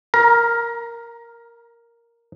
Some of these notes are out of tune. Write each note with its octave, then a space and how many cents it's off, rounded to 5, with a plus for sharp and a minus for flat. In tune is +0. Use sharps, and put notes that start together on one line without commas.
A#4 +0 A#5 +30